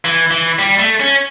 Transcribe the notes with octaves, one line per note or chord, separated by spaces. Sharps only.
E3
E3
G3
A3
C#4